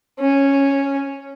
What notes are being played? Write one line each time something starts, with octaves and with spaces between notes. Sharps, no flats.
C#4